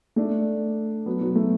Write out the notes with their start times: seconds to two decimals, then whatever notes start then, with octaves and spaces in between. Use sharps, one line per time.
0.16 A3 D4
1.06 F#3 B3
1.21 F#3
1.35 A3